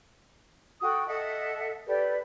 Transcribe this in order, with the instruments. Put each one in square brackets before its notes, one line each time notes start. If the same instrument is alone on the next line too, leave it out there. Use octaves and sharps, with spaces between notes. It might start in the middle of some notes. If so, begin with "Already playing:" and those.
[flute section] F#4 A4 G5 D#6
A4 D#5 E5 F#5
G4 A4 B4 D5